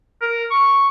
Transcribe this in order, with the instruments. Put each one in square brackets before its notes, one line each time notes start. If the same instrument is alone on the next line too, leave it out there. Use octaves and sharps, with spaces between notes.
[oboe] A#4
C#6